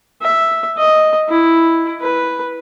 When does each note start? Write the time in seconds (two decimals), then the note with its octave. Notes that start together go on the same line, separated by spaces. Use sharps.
0.22 E5
0.78 D#5
1.29 E4
2.01 B4